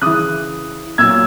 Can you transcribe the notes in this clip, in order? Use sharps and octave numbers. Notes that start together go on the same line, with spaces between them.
C#3 E3 D#6 F#6
A#2 F#3 E6 G#6